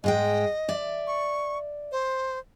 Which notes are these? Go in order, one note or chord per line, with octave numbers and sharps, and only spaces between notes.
G#2 G#3 D#5 G5
D5 E5
C#6
C5